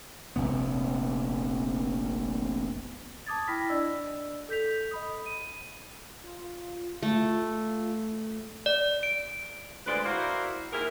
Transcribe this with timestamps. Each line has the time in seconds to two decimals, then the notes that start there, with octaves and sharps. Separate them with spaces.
0.36 F1 A#1 C3 B3
3.26 A5 D6 D#6 G#6 A6
3.48 E4 G5 B5 F6 A#6 B6
3.69 D4 D5 D#5 E6
4.49 A4 G6 B6 F7
4.91 D#5 B5 D#6
5.26 D#7
6.24 F4
7.03 A3
8.66 D5
9.03 D7
9.86 D2 G#3 F4 B4 C5 D5
10.04 E4 F#4 A#4 C5 D5 F5
10.72 D#2 E4 G#4 A#4